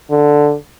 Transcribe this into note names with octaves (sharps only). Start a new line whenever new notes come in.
D3